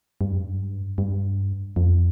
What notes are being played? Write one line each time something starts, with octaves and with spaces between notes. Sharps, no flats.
G2
F#2
G2
G2
F2